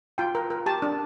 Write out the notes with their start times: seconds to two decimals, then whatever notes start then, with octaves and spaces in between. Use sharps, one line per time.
0.18 F4 G5
0.35 A#4
0.50 A#4
0.66 G4 A5
0.82 D4